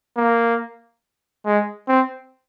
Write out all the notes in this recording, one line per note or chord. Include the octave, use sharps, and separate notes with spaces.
A#3
G#3
C4